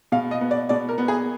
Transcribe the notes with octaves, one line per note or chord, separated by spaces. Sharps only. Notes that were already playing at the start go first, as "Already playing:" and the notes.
B2 F5
D#5
B3
D5
B2 D5
A#4
B3
G#4